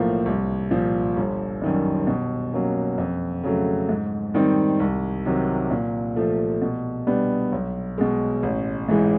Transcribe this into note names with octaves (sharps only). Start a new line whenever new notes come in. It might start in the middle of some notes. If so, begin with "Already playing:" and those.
Already playing: B1 A2 F3 A#3
C2
A#2 F3
G1
F#2 D#3 G3
B2
F#3 A#3 C#4
F2
C#3 F#3 A3
G#2
D#3 G3 C4 D#4
C2
C3 D#3 F#3
A#2
F3 A3
B2
G3 B3 D4 G4
B1
B2 G#3
A1
G#2 E3 G#3